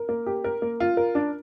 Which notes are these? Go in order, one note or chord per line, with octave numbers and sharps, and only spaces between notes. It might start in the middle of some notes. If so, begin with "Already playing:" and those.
Already playing: A#4
A#3
G4
A#4
A#3
F4
A#4
D4